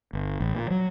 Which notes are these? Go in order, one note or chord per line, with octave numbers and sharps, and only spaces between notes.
G1
A1
A#2
F#3